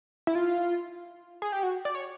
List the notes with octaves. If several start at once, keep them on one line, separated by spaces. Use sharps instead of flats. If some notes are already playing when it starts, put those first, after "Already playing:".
E4
F4
G#4
G4
F#4
D5
C#5